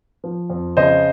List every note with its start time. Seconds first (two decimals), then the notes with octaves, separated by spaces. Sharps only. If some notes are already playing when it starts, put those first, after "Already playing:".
0.24 F3
0.50 F2
0.77 C#3 C5 D#5